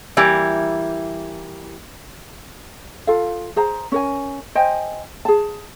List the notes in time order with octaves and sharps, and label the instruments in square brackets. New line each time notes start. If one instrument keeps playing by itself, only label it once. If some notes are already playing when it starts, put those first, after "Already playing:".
[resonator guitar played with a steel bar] E3 G3 A#3 E4
[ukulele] F4 A4 F5
G#4 C5 A#5
C#4 A#4 G#5
C5 D#5 G5 G#5
G#4 A5